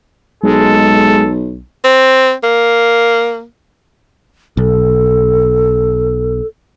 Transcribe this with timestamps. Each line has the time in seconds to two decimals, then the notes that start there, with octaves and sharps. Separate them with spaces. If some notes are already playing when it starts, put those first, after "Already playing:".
0.44 B1 G#3 A4
1.84 C4
2.43 A#3
4.57 B1 A4